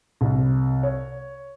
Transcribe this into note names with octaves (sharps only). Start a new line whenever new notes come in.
C2
C#5